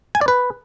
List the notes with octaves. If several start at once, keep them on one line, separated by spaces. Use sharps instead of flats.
G#5
D5
B4